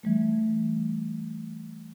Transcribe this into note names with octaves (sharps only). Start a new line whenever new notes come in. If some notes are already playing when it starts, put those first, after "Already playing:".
E3 G3 A3